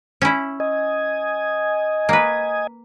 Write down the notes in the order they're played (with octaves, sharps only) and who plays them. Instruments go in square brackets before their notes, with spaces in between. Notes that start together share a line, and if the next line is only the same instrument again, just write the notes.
[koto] C#4 E4
[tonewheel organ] D#5 G#5
[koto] A#3 B4